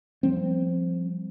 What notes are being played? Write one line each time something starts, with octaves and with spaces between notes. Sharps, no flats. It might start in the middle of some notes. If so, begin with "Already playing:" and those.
F3 G3 C4